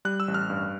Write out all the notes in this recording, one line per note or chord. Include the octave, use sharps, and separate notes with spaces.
G3 F#6
E6
A1
F6
G2